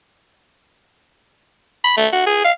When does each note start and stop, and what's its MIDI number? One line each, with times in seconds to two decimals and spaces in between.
1.84 1.96 83
1.97 2.08 57
2.13 2.22 66
2.26 2.43 68
2.44 2.51 77